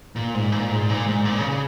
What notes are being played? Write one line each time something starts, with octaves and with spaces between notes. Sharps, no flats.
A#2
G#2
A#2
G#2
A#2
G#2
A#2
C#3
C#3